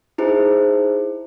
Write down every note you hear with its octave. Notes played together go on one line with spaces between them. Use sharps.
D#4 E4 G#4 C5